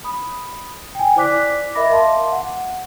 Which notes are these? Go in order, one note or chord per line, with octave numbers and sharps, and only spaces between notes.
B5 D#6
G5 G#5
E4 C5 D5 D6 F#6 B6
A#4 D#5 E5 B5 D6 A#6
E5 F5 A5 C6 D6
F#5